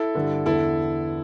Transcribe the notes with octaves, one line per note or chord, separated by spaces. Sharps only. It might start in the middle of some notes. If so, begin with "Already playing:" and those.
Already playing: E4 A4
G2 D3
E2 D3 E4 A4